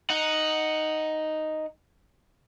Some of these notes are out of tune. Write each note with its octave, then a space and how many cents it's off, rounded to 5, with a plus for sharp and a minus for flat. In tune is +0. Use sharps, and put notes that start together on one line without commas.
D#4 +0 F#5 +0